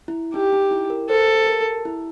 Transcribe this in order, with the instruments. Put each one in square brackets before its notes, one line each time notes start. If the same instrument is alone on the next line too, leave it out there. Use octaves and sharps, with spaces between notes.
[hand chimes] E4
[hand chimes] D#4 [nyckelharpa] G4
[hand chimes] D#4
E4
A#4
[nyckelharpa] A4 [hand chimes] C5
[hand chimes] A#4
E4